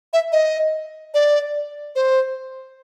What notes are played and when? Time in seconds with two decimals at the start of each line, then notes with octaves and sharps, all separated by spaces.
0.13 E5
0.32 D#5
1.14 D5
1.95 C5